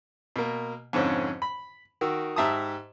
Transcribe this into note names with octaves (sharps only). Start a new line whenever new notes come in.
B2 A#3
F2 G#2 D3 C4 C#4
B5
D#3 F#4 A#4 E6
G#2 G4 E5 A5 A#5 D#6